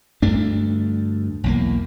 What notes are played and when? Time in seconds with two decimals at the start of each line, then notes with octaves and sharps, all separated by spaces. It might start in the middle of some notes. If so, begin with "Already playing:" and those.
0.22 D2 G2 A3 D4
1.44 B1 E2 A#3